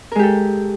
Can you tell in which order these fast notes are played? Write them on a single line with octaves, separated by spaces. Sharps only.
A#4 G#3 G4 A4